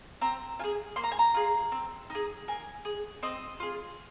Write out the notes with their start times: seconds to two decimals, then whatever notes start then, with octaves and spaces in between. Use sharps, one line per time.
0.21 C4 A#5
0.59 F4 G#4 G#5
0.96 A#3 C6
1.04 A#5
1.12 G#5
1.19 A#5
1.34 F4 G#4
1.72 C4
2.10 D#4 G#4
2.48 A#3 G#5
2.85 G#4
3.23 C4 D#5
3.60 F4 G#4